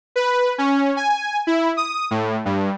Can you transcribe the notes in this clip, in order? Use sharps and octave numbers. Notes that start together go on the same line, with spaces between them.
B4
C#4
G#5
E4
D#6
A2
G2